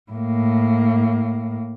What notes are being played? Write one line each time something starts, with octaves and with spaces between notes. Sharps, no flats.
A2 A#3